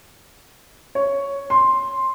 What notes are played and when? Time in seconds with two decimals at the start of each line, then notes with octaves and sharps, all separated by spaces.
0.95 C#5
1.50 C6